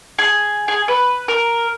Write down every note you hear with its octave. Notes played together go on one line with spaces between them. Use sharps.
G#4
G#4
B4
A#4